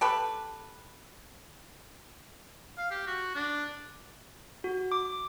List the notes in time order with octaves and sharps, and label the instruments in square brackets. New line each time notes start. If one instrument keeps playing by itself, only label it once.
[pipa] G4 A4 B4
[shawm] F5
G4
F#4
D4
[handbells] F#4
D6